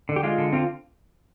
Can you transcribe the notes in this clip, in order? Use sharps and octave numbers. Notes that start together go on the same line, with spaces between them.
D3
G4
G#3 F4
D3
C4 F4